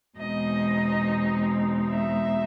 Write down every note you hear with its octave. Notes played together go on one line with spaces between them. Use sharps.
E2 B2 G#3 C4 D#4 D#5
E5